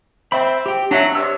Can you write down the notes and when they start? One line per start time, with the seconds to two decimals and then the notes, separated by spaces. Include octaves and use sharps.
0.32 C4 C5 E5 B5
0.66 G4 G5
0.91 F#3 D4 E5
1.15 G2 C3 C#5 E6